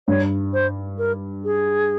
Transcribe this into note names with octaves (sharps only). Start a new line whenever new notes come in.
G2 C#5
C5
A#4
G#4